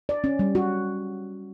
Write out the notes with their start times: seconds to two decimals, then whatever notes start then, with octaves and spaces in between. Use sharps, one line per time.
0.09 D5
0.24 C#4
0.39 G3
0.55 F#4